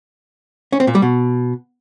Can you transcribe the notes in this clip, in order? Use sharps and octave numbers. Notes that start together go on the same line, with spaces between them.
C#4
C4
A#2
G3
B2